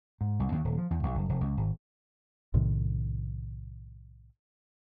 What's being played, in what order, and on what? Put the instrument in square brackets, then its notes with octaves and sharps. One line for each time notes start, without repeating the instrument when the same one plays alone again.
[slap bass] G#2
C2
D#2
D#1
F3
E2
B1
F#1
F1
C#2
G#1
[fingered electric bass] B1 A2 C3 D#3